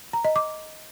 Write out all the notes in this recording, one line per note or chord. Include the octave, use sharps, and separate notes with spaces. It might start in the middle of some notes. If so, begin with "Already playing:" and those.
A#5
D#5
D6